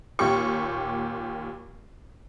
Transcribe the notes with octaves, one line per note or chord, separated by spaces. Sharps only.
D#2 A#2 G4 C#6